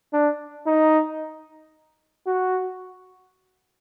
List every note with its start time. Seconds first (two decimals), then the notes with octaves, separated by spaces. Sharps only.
0.13 D4
0.66 D#4
2.26 F#4